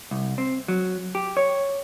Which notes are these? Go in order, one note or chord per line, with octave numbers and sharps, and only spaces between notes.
C2
C4
F#3
G4
C#5